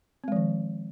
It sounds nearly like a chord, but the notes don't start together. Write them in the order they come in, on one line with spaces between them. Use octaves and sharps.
C4 G#3 F3 D#3